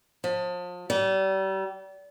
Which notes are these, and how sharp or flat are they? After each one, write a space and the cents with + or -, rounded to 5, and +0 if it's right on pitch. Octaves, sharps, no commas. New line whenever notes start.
F3 +35
G3 -35